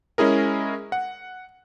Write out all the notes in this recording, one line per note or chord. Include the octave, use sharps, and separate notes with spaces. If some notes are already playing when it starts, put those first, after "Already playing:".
G#3 C#4 E4 G#4 A#4
F#5